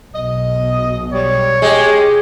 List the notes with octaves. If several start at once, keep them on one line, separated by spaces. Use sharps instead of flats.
B1 B2 D#5
G3 C#5
G#3 G4